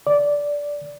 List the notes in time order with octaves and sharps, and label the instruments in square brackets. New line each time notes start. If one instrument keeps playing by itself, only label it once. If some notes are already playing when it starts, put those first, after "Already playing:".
[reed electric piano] D5